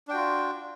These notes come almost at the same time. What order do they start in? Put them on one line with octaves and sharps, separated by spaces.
D4 G5 F#4 F4